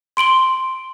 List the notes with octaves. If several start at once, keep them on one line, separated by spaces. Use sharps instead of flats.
C6 D7 F#7 G7